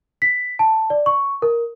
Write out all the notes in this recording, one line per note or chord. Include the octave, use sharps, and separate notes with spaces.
B6
A5
D5
C#6
A#4